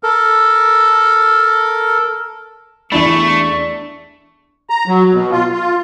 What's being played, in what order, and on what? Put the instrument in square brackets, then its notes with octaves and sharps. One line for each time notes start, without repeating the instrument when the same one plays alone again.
[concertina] A4 A#4
[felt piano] E2 E4 B5 [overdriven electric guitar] A3 [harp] D4 [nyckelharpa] C#6
[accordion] A#5
F#3
B2
F4
F4